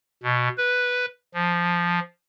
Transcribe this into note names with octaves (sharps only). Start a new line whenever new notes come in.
B2
B4
F3